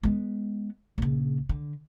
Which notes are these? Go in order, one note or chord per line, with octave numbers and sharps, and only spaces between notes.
G#3 B3
A#1 C#3
D3